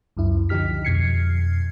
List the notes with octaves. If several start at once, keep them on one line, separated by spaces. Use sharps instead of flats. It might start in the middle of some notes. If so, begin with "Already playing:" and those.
C#2 F#2 E4
D3 F3 D#4 G4 F6 B6
F2 B2 F6 G#6 C7 C#7